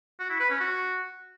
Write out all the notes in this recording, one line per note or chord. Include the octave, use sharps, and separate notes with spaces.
F#4
E4
B4
C#4
F#4